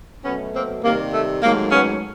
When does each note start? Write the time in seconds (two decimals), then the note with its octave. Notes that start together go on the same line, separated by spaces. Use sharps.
0.24 B2 F#3 A3 B3 C#4
0.54 A#3 C4
0.83 C3 D#3 G3 A#3
1.13 A3
1.42 G#2 D#3 F#3 A3 A#3
1.71 B3 C#4